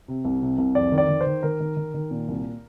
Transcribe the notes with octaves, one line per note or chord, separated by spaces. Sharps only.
C3
C2
C3
C2
F2 D5
D#3
D5
D#3
C5
D#3
D#3 A#4
D#3
D#3
D#3
A#2
C2